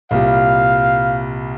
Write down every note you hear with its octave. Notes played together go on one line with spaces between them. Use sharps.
C2 A#2 G3 F5